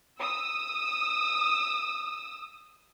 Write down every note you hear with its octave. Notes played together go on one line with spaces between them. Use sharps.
D#6 E6